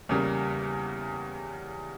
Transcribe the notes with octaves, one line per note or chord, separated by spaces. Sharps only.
E2 C#3 G3 A#3